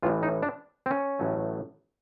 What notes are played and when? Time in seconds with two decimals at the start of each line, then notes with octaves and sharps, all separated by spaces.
0.03 A1 A2 E3 F4
0.23 D#4
0.42 D4
0.86 C4
0.91 C#4
1.19 A1 A2 F#3 A3